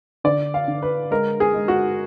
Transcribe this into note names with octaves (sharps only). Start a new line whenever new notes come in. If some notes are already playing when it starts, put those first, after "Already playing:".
D3 D5
F5
D3
B4
G#3 A#4
G#4
G#3
F#4